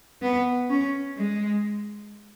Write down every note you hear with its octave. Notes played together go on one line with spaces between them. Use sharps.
B3
C#4
G#3